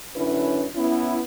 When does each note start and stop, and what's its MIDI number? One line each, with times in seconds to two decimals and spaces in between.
0.16 0.66 42
0.16 0.66 50
0.16 0.66 61
0.16 0.66 62
0.16 0.66 64
0.16 0.66 71
0.75 1.20 59
0.75 1.20 61
0.75 1.20 64